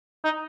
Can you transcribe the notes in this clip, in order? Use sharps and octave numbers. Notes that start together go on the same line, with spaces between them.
D#4